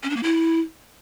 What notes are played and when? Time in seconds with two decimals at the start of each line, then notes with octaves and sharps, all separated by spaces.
0.03 C#4
0.10 D4
0.16 A#3
0.23 E4